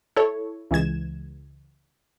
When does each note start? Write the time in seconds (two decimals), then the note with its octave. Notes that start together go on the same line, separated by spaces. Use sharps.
0.16 E4 A4 C#5
0.71 C#2 E3 G#3 G#6 E7